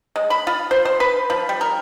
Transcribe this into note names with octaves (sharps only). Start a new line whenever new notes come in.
G#3
B5
F4
C5
C5
B4
F3
G3
A#4